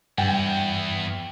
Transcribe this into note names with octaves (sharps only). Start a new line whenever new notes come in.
E2 G2 G5